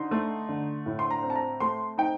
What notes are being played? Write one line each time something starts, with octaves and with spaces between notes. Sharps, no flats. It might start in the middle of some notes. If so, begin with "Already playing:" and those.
Already playing: D3 D#4 C6
A3
D3
A2
C6
A#5
C4
A5
A#5
A3 C6
D#4 G5